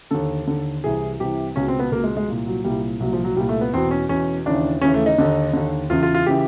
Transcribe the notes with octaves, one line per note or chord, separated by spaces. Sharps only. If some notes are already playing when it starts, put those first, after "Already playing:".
D#2 D3 A4
D#2 D3
C2 C3 E3 G#4
C2 C3 E3 G4
C#2 B2 C#4
C4
B3
C#2 B2 A#3
G#3
G#3
C2 A#2
F#3
C2 A#2 G3
C2 A#2 F#3
F3
F#3
C2 A#2 G3
A3
B3
E2 B2 C4
C#4
E2 B2 C#4
D#2 C#3 E3 D4
D#2 C#3 E3 C#4
A3
D#4
D#2 D3
D#2 D3
E2 C#3 E3 F4
F4
F4
C#3 E3 G4